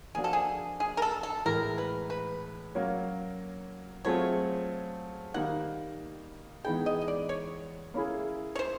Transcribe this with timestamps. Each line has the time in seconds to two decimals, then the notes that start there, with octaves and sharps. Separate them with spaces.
0.15 F3 A#3 D4 F#4 G#4
0.24 A4
0.33 G#4
0.80 G#4
0.97 A#4
1.02 A4
1.23 A4
1.45 A2 E3 G#3 A#4
1.78 B4
2.10 B4
2.75 F#3 A#3 C#4
4.05 F#3 A3 C4 F4 G#4 C#5
5.34 D#3 G3 A#3 D#4 F#5
6.64 E3 G#3 B3 D#4 G#4 G5
6.86 D#5
7.02 D#5
7.08 D5
7.29 C#5
7.94 A#3 C#4 E4 G#4
8.55 C#5
8.59 C5